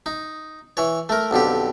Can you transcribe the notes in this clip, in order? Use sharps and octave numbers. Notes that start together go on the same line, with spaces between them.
D#4
E3 C#5
A3 A#4
B1 F2 D3 G4